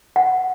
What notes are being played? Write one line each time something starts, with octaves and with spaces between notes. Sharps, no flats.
F#5